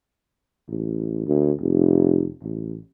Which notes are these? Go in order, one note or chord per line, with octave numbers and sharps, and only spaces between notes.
A1
D2
F1
A1